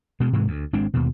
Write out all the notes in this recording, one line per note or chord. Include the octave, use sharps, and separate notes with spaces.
B2 G#3
G#2 C3 E3 G#3
D2
G#1 G#3 C4 D4
D#2 B2